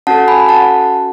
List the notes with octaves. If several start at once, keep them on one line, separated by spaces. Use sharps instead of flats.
C#4 F#4 A4 F#5 A5
G#5 B5
F#5 A5